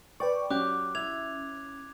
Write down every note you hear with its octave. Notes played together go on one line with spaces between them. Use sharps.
B4 D5 G5 C#6
F#3 C#4 G4 D6 F#6
E4 G#6 F7